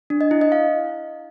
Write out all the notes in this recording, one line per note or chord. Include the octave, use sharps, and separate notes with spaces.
D4
D#5
E4
D#5
F5